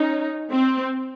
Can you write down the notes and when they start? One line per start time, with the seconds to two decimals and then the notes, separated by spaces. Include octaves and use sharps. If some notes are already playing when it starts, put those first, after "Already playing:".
Already playing: C#4 D#4
0.51 C4